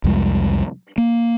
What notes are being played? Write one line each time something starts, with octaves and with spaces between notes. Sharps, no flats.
C2 F2 G3 G#3
A#3